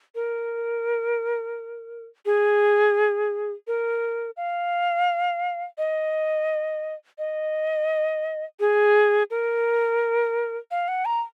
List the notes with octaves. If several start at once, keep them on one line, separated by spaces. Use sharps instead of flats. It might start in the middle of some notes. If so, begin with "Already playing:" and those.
A#4
G#4
A#4
F5
D#5
D#5
G#4
A#4
F5
F#5
A#5